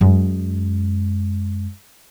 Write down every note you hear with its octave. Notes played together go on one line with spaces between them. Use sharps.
F#2 G#3